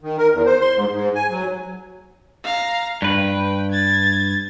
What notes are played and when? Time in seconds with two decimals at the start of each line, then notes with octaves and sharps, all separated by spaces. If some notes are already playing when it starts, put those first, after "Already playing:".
0.01 D#3
0.18 A#4
0.32 E2
0.46 C5
0.61 C6
0.74 G#2
0.91 G#2
1.15 G#5
1.30 F#3
2.44 F5 A#5
3.02 G2 B4 G5
3.71 G#6 A6